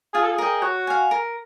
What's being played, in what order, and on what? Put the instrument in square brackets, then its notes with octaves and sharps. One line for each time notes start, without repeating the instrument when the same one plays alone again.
[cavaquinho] F4 [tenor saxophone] G#4
[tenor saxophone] A4
G#4
[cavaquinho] A#4 D#5 G5
[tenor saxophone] F#4 [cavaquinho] C#5
[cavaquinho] F5 G#5
A#4